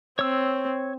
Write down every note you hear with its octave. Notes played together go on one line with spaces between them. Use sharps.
C4 C#5 E6